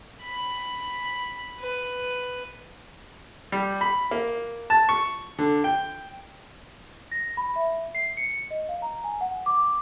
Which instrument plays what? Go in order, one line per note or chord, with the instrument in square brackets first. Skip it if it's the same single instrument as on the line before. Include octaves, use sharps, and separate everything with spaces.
[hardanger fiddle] B5
B4
[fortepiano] G3
B5
A#3
A5
C#6
D3
G5
[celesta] A#6
B5
E5
C7
C#7
D#5
F5
A#5
G#5
F#5
D6